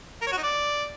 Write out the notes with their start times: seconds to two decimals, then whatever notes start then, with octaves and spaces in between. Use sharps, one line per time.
0.21 A#4
0.27 C#5
0.32 F#4
0.38 D#4
0.43 D5